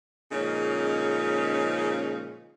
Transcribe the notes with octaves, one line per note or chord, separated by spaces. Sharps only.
A#2 C#3 F3 G#3 C#4 D#4